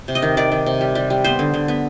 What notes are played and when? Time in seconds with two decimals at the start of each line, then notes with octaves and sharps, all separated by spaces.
0.08 C3
0.15 D#5
0.22 D#3
0.37 D#3 D5
0.52 D#3
0.66 C3
0.81 G3
0.95 G3
1.10 G3
1.24 B3 C5
1.39 D3
1.54 D3
1.68 B3